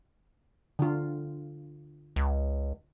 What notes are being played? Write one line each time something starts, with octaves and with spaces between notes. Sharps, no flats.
D3 F4
C#2